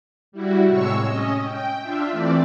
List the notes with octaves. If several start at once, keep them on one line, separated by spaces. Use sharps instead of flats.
G3 E4 F#4
A2 C3 G#3 C#5 C#6 E6
C#4 D#5
G5
D4 F4 E5
E3 A3 C4 D5